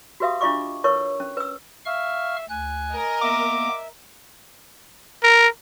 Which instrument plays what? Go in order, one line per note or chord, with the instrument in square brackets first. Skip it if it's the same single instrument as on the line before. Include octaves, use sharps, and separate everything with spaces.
[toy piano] F#4 G4 B4 E5 F5 D#6
D4 E4 F4 D#5 C#6 D6
E4 A#4 B4 C#5 C#6
C#4
B4 E6
[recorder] E5 [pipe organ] F5 C#6 F6
[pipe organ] D2 F#6 [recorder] G#5
[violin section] A#4 D#5
[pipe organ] A#3 B3 [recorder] E5 [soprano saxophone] D6
[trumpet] A#4